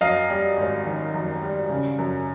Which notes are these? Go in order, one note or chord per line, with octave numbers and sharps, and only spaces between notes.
F#2 D#5 F5
G3
G#1
D#3
F#2
G3
C#3
F#2